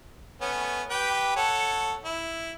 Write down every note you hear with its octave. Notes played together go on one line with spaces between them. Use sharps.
A3 B3 C#4
G4 B4 G5
A4 C#5 F#5
E4